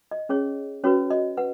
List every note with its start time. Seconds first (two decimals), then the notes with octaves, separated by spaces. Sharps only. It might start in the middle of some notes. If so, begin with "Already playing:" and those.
0.11 D#5
0.29 C#4 G#4 C#5
0.84 C#4 F#4 B4 C#5
1.11 D#5
1.37 B4 F#5